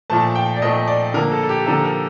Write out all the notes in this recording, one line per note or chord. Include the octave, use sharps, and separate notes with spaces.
A#2 F3 A3 A5
G5
D5
A#2 F3 A3 D#5
D5
D3 F3 A#3 A#4
A4
A4
G4
D3 F3 A#3 A4
A#4